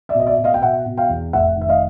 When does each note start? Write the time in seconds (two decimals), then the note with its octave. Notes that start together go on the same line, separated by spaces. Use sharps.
0.09 D5 E5
0.15 B2 D#5
0.26 D5 E5
0.38 B2
0.44 D#5 F5
0.54 G5
0.62 B2 E5 F#5
0.86 B2
0.97 F5 G5
1.09 E2
1.33 F1 E5 F#5
1.57 D#3 E5
1.69 D#5 F5